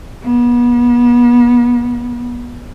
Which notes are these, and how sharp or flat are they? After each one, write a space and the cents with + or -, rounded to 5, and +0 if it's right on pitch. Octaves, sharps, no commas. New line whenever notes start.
B3 -35